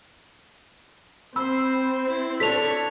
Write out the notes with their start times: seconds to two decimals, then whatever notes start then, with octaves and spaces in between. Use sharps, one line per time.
1.36 C4 C5 B5 E6
2.08 E4
2.40 D4 A4 C#5 B6 F7